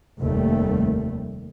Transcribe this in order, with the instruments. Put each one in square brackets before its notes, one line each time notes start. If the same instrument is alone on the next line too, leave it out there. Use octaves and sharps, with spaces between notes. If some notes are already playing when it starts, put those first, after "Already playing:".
[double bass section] F1 D#2 G3 A3